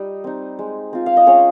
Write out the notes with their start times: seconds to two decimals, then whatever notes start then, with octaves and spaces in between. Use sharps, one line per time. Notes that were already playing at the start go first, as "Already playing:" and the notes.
Already playing: G3 D#4 D#5
0.24 C4 D#4
0.59 G#3
0.93 C4 F4
1.06 F5
1.17 D#5
1.27 G#3 C#4 C#5